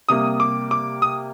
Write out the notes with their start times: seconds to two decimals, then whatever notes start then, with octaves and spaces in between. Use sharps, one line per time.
0.09 C3 G3 A#3 D#6
0.40 D6
0.71 D6
1.02 D#6